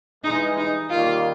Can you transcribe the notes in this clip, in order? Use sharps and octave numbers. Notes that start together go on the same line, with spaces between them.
G2 E3 G#3 D#4
D#4
D#2 D#3 G3 A#3 F4